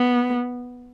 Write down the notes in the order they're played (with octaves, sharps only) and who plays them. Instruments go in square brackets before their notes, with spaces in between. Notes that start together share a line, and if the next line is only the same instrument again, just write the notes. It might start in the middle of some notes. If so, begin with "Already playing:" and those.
Already playing: [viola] B3